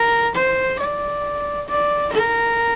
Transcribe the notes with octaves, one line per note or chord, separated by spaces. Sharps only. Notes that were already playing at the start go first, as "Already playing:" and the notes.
Already playing: A#4
C5
D5
D5
A#4